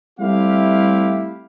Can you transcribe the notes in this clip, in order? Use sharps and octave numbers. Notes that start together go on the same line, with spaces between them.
G3 A3 C4 E4 G4 F5